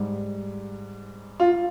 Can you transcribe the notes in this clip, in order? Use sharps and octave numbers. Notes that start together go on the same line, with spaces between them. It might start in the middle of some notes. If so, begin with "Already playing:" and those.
Already playing: G#2 G3
F4